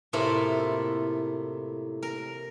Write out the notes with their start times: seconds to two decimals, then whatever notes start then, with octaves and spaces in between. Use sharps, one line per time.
0.13 A2 C3 A#3 E4 F4 A4
2.03 A#4